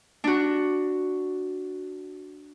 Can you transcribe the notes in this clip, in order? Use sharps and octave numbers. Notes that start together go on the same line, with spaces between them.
D4 F#4